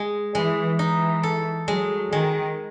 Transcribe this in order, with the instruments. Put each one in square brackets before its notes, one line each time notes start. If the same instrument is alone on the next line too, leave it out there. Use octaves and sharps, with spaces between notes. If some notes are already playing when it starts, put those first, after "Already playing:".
Already playing: [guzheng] G#3
[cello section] E3 [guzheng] G#3
[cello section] E3 [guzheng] D#4
[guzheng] A4
[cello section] F#3 [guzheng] G#3
[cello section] D#3 [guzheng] G#3